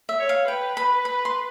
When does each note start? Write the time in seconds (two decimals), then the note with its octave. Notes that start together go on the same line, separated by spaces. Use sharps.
0.09 E5
0.19 C#5
0.29 F5
0.48 B4 G5
0.77 B5
1.05 B5
1.25 C6